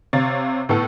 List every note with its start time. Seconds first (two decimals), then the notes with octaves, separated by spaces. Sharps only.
0.13 C3 C#5 F5 A6
0.69 A2 B3 A4